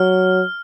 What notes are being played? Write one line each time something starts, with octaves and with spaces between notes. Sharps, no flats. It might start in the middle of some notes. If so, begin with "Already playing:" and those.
Already playing: F#3 F6